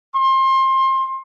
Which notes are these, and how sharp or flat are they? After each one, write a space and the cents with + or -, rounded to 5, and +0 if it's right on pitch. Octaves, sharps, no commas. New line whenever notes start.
C6 +25